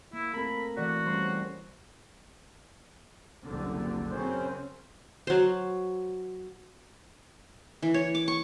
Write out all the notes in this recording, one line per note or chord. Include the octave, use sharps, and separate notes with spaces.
A#3 E4
A3 C4 A4 A#4 B5
E3 A3 F#4 D5
G3 C#4 C5
F#1 C2 D3
F#2 C#3 C4 C#4 C5
F#3 C5
E3
C#5
D6
C#6